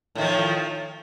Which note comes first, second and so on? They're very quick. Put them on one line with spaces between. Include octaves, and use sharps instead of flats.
A2 D#3 F3